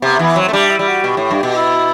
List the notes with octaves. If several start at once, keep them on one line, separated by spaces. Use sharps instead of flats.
C3 B3
E3 B3
F#3 C4
A3
G3 D4
E4
G3
F#4
B2 G4
A2
G2
B2
E4